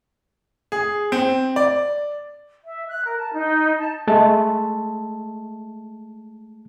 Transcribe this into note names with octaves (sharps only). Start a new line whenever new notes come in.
G#4
C4
D5
E5
F#6
A#4
A5
D#4
A5
G#3 A3 A5